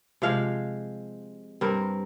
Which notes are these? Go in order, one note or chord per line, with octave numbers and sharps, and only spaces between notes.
C3 F3 G#3 F5
G2 G3 C4 A#4